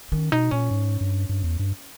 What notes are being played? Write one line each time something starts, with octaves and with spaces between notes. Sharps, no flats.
D#3 C#4
B2 D#4
A#2 C#4
G#2
G2
G2
E2
G2